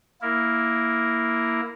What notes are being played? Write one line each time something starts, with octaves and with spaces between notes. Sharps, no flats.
A#3 E4 A#4